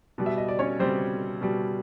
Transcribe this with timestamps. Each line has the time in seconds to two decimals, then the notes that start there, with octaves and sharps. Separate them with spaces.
0.18 B2 G3
0.26 E5
0.37 D#5
0.48 D5
0.59 C#4 C#5
0.79 B2 G3 C4 C5
1.41 B2 G3